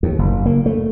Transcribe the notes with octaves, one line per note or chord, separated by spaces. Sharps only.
D#2
F#1
A#3
A3